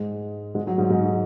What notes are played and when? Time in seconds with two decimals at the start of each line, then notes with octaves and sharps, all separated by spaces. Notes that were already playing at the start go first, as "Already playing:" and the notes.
Already playing: G#2 G#3
0.55 G#2 G#3
0.67 F#3
0.78 G#2 G#3
0.90 G#2 G#3
1.08 F#3